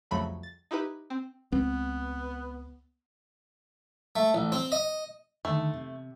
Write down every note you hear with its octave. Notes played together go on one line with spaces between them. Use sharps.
C2 F2 C#3 F#3 A3 B5
A6
D#4 E4 G4 B4
C4
C#2 B3 C4
A3
A1
C4
D#5
D3 D#3 A3
C3